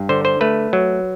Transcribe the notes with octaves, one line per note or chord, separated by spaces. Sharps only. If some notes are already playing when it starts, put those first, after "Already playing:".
Already playing: G2
D3 C5
C5
A3 B4
F#3